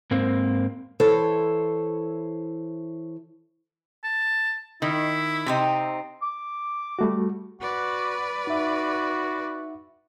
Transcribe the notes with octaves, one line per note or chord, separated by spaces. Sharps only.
G#2 A#3 C4
E3 E4 A4 C5 C#5
A5
D#3 E4
C3 C4 D#4
D6
G3 A3 F#4
F#4 B4 D5
D#4 F#4 E5